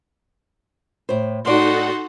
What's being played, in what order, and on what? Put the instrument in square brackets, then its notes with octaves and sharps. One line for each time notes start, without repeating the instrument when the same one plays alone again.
[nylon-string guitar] A2 C5
[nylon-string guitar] A2 D5 [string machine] D#4 A4 F#5 [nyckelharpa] F#4 C6